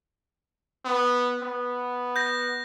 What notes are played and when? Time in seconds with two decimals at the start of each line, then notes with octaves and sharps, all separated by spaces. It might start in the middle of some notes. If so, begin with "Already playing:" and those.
0.85 B3
1.42 B3
2.16 G6 A#6